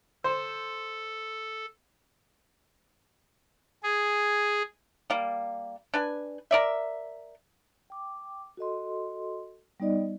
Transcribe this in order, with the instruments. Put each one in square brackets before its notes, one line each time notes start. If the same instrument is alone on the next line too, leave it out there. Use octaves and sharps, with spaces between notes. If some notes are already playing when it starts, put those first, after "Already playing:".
[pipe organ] A4 [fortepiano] C5
[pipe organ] G#4
[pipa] G3 A#3
D4 B4 G#5
A#4 D5 E5
[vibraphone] G5 D6
F#4 A4 D#5 C6
G3 B3 D#4 D5 D#5